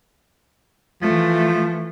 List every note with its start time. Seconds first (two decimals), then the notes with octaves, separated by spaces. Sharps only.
1.02 E3 F3 A3